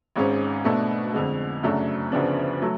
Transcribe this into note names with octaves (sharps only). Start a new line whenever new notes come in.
G#1 G#2 G#3 C#4
B2 A3 D4
F2 D3 G#3
F#2 C#3 F#3 A3 D4
D2 C#3 F3 B3 D4
F#3 A3